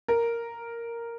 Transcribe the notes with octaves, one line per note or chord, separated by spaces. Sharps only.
A#4